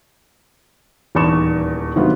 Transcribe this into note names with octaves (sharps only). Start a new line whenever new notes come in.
D#1 E2 D#3 A5 C#6 E7
C3 D#3 F#3 A3 B3 F4